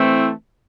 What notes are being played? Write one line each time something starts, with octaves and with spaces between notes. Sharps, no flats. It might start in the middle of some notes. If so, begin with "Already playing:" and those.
Already playing: E3 A3 C4